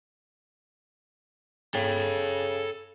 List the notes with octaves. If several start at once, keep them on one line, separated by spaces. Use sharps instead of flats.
C#3 A4 G5